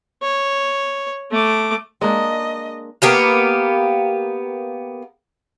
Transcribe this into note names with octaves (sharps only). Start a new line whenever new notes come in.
C#5
A3 D6
G#3 A#3 D4 D#5
A#3 B3 G4 F5